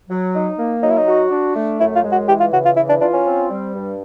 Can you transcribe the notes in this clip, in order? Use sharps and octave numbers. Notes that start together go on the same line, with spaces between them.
F#3
D#4
A#3
F#3 D#4
E4
D#4
F#4
D4
A3
F#2 E4
F4
G#3
F#4
E3 G4
F4
C#3 F#4
F4
E3 E4
D4
D4 F4
C#4
C4
G3
G2